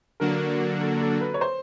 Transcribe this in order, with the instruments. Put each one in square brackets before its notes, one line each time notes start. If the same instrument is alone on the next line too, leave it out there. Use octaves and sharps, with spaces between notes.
[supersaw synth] D3 F#3 A#3 D4 F#4 [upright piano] A#4
[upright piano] A4
A4
B4
C#5
C5